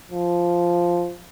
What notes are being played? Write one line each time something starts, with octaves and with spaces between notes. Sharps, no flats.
F3